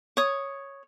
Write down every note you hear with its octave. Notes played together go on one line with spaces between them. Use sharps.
C#5 D#6